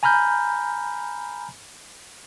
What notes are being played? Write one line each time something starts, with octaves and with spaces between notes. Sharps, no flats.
G#5 A#5 B5 F6 G6